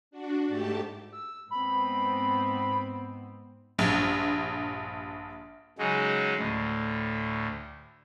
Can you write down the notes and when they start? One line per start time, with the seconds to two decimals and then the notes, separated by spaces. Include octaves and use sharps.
0.11 D4 F#4
0.48 G#2 A3 G4 A5
1.12 E6
1.51 G#2 B3 C4 B5
3.78 A#1 G2
5.78 C#3 F#3 G#3 D#4
6.38 D2 A2